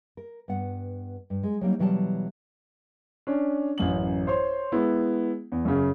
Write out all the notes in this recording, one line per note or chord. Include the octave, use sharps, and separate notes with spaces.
A#4
G2 B3 F#5
G2
G#3
F#3 G3 A#3 D#4
B2 E3 F#3 G3 G5 A5
C#4 D4
A1 F#2 F#7
C5 C#5 C6
G#3 B3 E4
E2
F#2 C#3